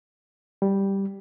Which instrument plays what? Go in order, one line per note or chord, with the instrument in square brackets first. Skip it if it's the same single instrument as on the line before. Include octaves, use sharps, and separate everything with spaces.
[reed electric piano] G3